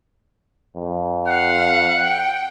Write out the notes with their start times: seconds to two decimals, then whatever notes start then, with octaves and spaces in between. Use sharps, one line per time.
0.75 F2
1.27 F5 F#5
2.03 G5